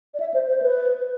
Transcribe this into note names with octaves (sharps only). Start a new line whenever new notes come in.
D5
E5
C5
C5
B4